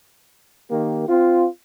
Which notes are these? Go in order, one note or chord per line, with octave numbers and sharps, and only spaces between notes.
D#3 A#3 G4
C4 F4